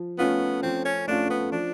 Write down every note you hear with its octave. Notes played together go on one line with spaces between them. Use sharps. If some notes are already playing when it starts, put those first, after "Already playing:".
Already playing: F3
A3 B3 C#4 F4
F3 C4
C#4
A3 C#4 D4 F4
B3
F3 D4